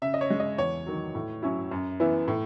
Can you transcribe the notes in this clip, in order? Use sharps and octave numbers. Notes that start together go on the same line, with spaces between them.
C#3 E5
D#5
C#5
G#3 C#4
D#5
E2 C#5
D#3 F#3
A2
F#3 C#4 E4
F#2
E3 B3 E4
A2